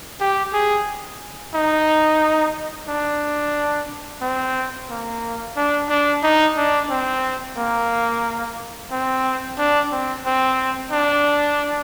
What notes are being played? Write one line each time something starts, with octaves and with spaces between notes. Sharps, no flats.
G4
G#4
D#4
D4
C4
A#3
D4
D4
D#4
D4
C4
A#3
C4
D4
C4
C4
D4